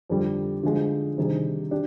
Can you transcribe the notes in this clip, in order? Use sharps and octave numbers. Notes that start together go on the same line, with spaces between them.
F2 D3 G3
D3 F3 G#3
C3 D#3 G3 D4 G#4
D4 G4